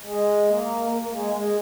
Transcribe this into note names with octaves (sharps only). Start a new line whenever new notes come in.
G#3
A#3
A#3
A#3
G#3
G#3